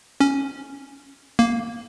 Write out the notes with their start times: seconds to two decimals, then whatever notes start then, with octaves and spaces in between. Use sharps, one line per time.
0.20 C#4
1.39 A#3